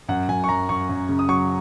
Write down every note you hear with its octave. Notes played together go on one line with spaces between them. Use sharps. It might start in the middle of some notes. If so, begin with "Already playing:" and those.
F#2 F#5
F#2 G#5
C#6
F#2 A#5
F#2 C#6
F#2
C#3
D#6
F#3 C#6